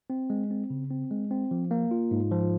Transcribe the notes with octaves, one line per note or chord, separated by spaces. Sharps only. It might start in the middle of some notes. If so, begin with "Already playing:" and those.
C4
G#3
C4
C#3
C4
G#3
C4
F3
A#3
F4
G#2
F3